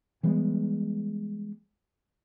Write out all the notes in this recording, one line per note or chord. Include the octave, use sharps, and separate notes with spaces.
E3 G3 G#3 B3